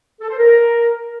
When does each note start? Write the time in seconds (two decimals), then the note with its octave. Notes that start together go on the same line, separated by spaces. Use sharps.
0.21 A4
0.29 C5
0.38 A#4